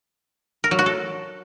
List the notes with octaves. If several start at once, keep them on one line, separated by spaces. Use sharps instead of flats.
A#4
F#3
F#4
A4